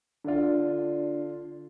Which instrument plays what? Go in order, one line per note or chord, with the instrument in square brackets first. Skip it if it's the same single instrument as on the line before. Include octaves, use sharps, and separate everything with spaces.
[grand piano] D3 F4 [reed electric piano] D4 D5